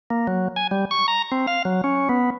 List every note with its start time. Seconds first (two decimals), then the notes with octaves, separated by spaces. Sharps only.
0.10 A#3
0.27 F#3
0.56 G#5
0.71 G3
0.91 C#6
1.08 A#5
1.32 C4
1.47 F5
1.65 F#3
1.84 C#4
2.09 B3